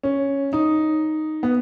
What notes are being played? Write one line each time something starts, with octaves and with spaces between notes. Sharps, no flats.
C#4
D#4
B3